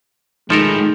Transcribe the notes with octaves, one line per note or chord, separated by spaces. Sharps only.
D#3 F3 G#3 A3 E4 A4 A#4